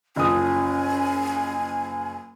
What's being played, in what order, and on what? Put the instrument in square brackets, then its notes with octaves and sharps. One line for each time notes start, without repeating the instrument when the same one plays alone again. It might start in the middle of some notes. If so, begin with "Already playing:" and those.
[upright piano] F#1 F3 D#6 [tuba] C#4 [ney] G#5